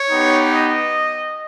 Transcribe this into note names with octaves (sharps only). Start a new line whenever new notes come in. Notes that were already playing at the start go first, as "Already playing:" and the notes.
Already playing: C#5
B3 D#4 G4
D#5